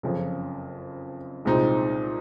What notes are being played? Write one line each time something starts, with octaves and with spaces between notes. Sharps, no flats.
F#1 F2 C#3 F3
C2 A#2 G#3 C4 D#4